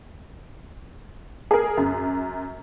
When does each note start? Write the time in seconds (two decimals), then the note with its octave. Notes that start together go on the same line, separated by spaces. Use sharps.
1.51 G#4 A#4
1.77 F#2